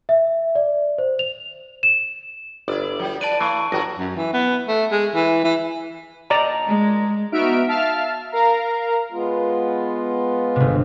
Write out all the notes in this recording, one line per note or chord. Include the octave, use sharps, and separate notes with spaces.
E5
D5
C5
F7
E7
G1 E4 D5
F#3 G3
B4 D5 A5 D7 D#7
E3 A3 C#6
G1 F#3 F#4 A#4 A#6
F#2
E3
B3
A3
G#3
E3
E3
A#2 D4 D#4 D5 A#5
G#3
B3 D#4 F#4 E5 F6 D7
E5 F5 A5 F6
A#4 F5 A#5
G#3 B3 F4
G1 C3